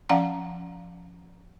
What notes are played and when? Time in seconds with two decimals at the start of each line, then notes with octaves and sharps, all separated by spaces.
0.09 F3 C#4 F5 F#5 A#5